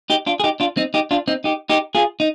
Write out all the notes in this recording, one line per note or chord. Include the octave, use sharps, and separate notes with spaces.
D#4 G4
D4 F4
G#4
D#4 G4
D4 F4
C4 D#4
D#4 G4
D4 F4
C4 D#4
D#4 G4
D#4 G4
F4 G#4
D#4